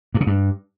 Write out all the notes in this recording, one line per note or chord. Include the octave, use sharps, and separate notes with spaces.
G2
C#3
G2